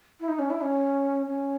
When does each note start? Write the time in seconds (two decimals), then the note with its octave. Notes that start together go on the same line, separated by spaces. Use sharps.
0.20 E4
0.28 D#4
0.39 C#4
0.50 E4
0.61 C#4
1.27 C#4